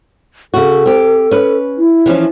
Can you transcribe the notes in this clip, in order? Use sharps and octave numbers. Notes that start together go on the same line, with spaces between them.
C#3 F#4 A4
C4 G4
C#4 B4
E4
E3 F3 C#4